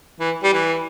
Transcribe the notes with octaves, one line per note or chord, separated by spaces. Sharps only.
E3
G3
E3